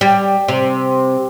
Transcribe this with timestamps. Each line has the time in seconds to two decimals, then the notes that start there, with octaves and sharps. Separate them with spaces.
0.01 G3
0.48 C3